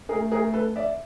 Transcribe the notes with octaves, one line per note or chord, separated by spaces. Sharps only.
A3 G#4 A#4
G#4 A#4
A4 B4
D5 E5